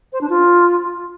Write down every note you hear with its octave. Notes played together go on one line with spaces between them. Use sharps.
C5
D4
F4